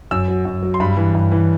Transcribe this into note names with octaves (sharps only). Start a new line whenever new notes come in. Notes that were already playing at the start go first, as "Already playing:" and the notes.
F#2 E6
F#3
F#2
F#3
C6
G2 B5
E3
G2
E3